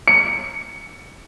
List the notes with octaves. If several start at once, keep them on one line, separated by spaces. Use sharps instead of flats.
C#7